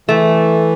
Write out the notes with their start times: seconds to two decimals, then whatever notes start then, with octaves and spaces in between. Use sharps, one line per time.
0.09 E3 A3